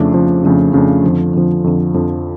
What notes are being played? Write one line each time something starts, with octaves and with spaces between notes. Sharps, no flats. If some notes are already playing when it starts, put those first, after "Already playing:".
Already playing: F2 C#3 F3 A3 D4
F2 C#3 F3 A3 D4
F2 C#3 F3 A3 D4
F2 C#3 F3 A3 D4
F2 D3 F3
F2 D3 F3
F2 D3 F3
F2 D3 F3